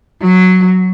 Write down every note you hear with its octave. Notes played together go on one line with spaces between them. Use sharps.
F#3